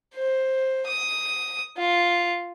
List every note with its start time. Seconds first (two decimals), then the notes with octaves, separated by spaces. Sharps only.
0.14 C5
0.86 D#6
1.77 F4